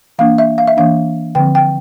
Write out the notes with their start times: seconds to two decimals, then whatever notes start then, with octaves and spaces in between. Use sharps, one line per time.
0.19 E3 A#3 D4 F5
0.38 E5
0.58 F5
0.67 E5
0.77 E3 A#3 D4 F5
1.35 D3 F3 C4 G5
1.55 G5